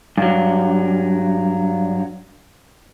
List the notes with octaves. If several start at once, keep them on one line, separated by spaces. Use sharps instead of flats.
G2 F#3